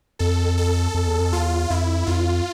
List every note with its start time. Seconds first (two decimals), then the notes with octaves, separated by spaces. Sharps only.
0.19 F2 A4
0.58 A4
0.94 F2
1.07 E2
1.19 F2
1.32 E2 F4
1.70 F2 E4
2.07 F2 F4